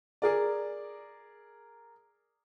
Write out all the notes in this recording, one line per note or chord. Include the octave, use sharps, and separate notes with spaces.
G#4 A#4 D5